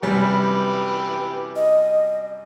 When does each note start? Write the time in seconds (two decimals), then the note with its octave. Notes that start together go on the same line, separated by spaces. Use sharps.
0.03 F#2 C3 E3 G3 G4 B4
1.56 D#5